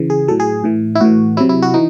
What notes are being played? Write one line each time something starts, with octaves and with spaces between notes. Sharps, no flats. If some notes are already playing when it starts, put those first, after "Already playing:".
Already playing: C#3 E3
G#4
A2 F#3 A4
G#4
A2 E3
E4
A2 E3 F#4
C3 F#3 E4
E4
F#4
E3 D#4